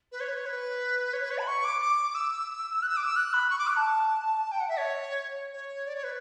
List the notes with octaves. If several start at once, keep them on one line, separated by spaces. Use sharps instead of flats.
B4
C#5
B4
C#5
B4
C#5
B4
C#5
B5
C#6
D6
D6
E6
F#6
E6
D6
E6
F#6
B5
C#6
D6
F#6
A5
G5
F#5
E5
C#5
C#5
D5
C#5
B4